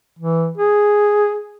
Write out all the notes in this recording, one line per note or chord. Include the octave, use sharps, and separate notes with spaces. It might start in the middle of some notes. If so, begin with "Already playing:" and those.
E3
G#4